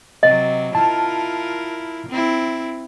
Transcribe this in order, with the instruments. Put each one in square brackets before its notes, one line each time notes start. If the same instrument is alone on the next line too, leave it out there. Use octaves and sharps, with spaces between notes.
[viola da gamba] C3 F#3 [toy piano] D#5
[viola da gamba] E4 F4 A#4 [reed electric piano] A5
[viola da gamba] C4 E4